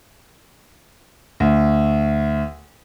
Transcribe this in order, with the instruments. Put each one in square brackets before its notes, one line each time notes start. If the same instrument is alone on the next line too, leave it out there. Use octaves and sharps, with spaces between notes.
[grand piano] D2